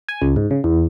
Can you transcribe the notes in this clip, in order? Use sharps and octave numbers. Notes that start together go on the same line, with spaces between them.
G#5
C#2
G#2
C#3
E2